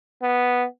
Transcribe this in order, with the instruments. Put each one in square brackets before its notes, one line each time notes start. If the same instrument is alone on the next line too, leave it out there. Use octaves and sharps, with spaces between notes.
[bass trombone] B3